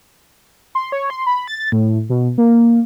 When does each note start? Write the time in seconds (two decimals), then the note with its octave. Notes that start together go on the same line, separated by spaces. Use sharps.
0.75 C6
0.92 C#5
1.10 C6
1.27 B5
1.48 A6
1.72 A2
2.10 B2
2.38 A#3